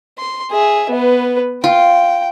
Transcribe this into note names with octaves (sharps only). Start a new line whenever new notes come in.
C6
G#4 E5
B3 B4
F4 G5